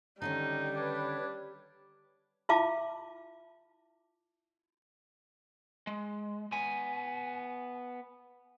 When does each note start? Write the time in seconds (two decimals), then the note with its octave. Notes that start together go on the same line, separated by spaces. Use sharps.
0.22 D3 D#3 G3 C#4 D#4
0.76 D4 B4 C#5 G#6
2.49 E4 F4 E5 F5 A5 D6
5.87 G#3
6.52 B3 G#5